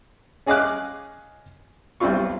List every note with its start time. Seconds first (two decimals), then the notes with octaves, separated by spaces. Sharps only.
0.46 C#4 G#4 D#5 F5 D6 F#6
2.00 B1 G3 C4 E4 F4 C#6